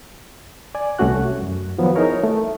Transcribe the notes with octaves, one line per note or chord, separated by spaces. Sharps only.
D5 G#5
C2 G3 A3 C#4 F#4 F#6
F#2
D#3 F3 F#3 B3
D#4 E4 G#4 A#4 C#5
A3